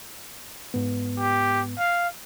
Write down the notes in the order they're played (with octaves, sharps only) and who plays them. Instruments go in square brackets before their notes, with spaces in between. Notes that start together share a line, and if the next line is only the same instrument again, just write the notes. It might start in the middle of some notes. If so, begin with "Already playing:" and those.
[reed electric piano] G#2 B3
[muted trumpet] G4
F5